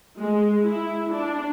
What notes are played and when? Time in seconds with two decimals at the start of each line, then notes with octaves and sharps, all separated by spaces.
0.17 G#3
0.63 E4
1.12 D4